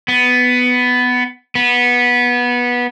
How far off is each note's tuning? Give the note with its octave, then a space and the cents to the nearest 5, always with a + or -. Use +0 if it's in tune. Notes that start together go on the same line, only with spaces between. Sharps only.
B3 +10
B3 -15